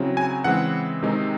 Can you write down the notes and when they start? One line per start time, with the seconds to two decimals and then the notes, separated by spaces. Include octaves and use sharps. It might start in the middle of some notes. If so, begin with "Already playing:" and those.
Already playing: C#3 F#3 C4 E4
0.17 G#5
0.44 C#3 E3 G#3 C4 E4 F#5
1.02 C3 D#3 G#3 C4 D#4